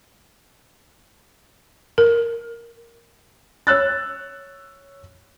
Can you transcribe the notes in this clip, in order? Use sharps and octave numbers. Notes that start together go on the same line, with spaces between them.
A#4
C#5 E6 F#6 A6